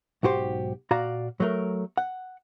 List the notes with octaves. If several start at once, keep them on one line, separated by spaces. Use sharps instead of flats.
B1 G#2 F#4 G4 C5
A#2 F#4 D5 F5 A#5
F#3 A3 A#4
F#5